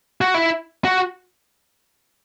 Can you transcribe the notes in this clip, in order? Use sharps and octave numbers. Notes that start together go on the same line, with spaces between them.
F#4
E4
F#4